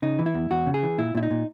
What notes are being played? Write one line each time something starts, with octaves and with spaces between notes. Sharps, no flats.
C#3 D#4
E3
E4
E2
E2 F#4
C#3
G#4
E3
A#2 E4
A#2 E4
D#4
A#2